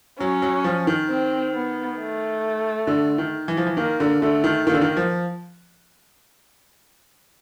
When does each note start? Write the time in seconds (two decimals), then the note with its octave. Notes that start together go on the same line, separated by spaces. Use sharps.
0.20 F#3 C#4
0.42 F#3
0.64 F3
0.87 D#3
1.10 C4
1.55 B3
1.99 A3
2.87 D3
3.18 D#3
3.48 E3
3.57 F3
3.67 E3
3.77 D#3 A#3
4.00 D3
4.22 D3 A3
4.44 D#3
4.67 D#3 A#3
4.74 D3
4.81 D#3
4.97 F3